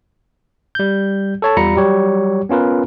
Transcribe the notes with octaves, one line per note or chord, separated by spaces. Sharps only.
G3 G6
A4 C#5 A5
E2 G3 F4 A#5 B5 C#7
F#3 G3 G4 C#5
B3 C#4 F4 A#4 B4